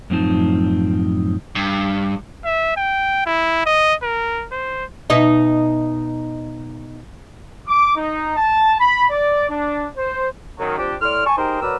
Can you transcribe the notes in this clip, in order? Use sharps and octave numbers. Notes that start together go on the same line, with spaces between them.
F#2 A2 F3 C4 D#4 A5
G2
E5
G5
E4
D#5
A#4
C5
B2 D#4 E5
D6
D#4
A5
B5
D5
D4
C5
F#2 D#3 F#3
F3 C4 D4 G4
A2 D5 C6 F6
G#5 A5 C#6
D#4 G4 G#4 A#4 C5
B2 F#3 A#4 B4 D5 E6